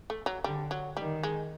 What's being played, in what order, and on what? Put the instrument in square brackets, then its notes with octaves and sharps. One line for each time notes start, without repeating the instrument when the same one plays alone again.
[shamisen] A3
F#3
[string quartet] D3 [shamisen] G3
[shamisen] F#3
[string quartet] D#3 [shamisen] G3
[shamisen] G#3